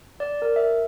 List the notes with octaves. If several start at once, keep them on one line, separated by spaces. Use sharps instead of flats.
D5
A#4
E5